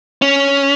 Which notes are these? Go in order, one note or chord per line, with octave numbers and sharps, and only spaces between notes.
C#4